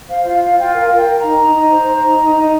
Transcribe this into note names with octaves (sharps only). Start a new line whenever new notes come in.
C5 F5
F4 F5
F4 F5
F4 G5
A#4 F5
F5
A#4
G5
A#4
A#5
D#4
D#4
D#4
C5
C5
D#4
D#4
D#4